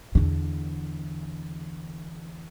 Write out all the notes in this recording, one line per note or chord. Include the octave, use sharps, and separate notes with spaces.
E2 D3